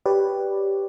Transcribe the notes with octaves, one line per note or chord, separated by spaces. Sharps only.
G4 B4 C#5 D5